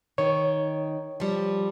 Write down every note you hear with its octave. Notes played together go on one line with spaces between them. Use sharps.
D#3 C#5
F3 G3